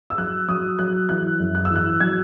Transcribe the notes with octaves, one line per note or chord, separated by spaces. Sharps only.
E6
F#3 F#6
F#3 D#6
F#3 F#6
E3 F#6
F#2
F#6
E6
E3 F#6
F#3 G#6